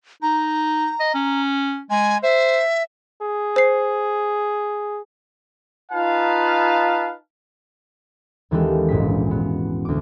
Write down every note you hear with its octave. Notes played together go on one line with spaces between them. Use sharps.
D#4 A#5
D#5
C#4
G#3 G#5
C5 E5
G#4
C5 C7
D#4 F4 B4 F5 A5
D#2 E3 G#3 C#4 G4 A4
E1 A#1 G#2 B6
B3
D2 D6